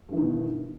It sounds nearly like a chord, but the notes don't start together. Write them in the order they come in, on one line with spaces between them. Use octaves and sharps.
G2 E3 D#3 B2